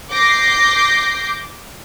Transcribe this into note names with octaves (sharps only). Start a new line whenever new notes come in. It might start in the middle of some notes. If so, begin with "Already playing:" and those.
D6 G6 A#6 C7